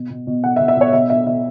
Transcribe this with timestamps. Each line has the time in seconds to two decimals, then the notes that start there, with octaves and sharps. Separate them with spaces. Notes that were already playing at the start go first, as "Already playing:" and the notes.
Already playing: B2
0.10 B2
0.27 B2
0.44 B2 F#5
0.56 E5
0.60 B2
0.68 E5
0.77 B2 C#5
0.93 B2 E5
1.10 B2 E5
1.26 B2 E5